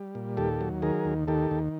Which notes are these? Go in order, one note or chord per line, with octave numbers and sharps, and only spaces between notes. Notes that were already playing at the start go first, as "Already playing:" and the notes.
Already playing: G3
A#2
D#2 G4 A4
F#3
D#3 G#4 A#4
D#2
D#3 G4 A4
D#2